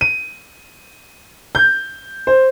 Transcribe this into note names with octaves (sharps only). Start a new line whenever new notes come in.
D#7
G6
C5